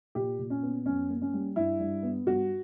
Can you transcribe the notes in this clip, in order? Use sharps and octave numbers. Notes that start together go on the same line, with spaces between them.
A#2 G4
A#2
C#4
B3
F#2 C#4
A#3
C#4
G3
G2 E4
G2
B3
G2 F#4